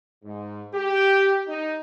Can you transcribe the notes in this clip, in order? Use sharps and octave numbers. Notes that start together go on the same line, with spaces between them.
G#2
G4
D#4